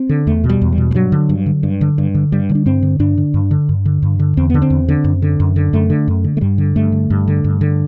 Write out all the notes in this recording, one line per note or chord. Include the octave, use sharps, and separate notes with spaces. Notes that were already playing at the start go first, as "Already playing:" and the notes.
Already playing: C4
D3
E2 A3
B2
G3
E2
G3
B2
G3
G2 F#3
D3
G2
D3
G2
D3
G2
D3
G2 G3
D3
D4
G2 C4
D3
G2 D4
D3
G2
D3
G2
D3
G2
D3
E2 C4
D3 B3
C4
E2
D3
F#2
D3
F#2
D3
F#2 A3
D3
F#2
D3
A3
G2 G3
D3
G2 A3
D3
G2
D3
G2
D3